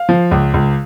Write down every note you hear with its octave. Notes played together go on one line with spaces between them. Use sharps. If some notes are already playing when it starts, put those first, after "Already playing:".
Already playing: F5
F3
C#2
C#2